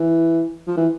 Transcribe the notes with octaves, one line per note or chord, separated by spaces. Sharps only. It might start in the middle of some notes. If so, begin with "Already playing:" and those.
Already playing: E3
F3
E3